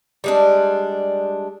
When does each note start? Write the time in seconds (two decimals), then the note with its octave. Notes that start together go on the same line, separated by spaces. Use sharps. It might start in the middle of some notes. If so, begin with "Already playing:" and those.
0.24 G3 G#3 D4